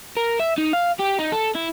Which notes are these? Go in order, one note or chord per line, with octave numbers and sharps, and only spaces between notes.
A#4
E5
D#4
F5
G4
D#4
A4
E4